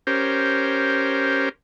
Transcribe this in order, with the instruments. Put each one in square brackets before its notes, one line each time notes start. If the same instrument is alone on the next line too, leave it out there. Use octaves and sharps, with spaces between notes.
[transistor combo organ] C#4 G4 A#4 C5